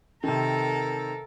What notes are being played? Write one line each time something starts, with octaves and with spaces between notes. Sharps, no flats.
C3 D#3 A4 A#4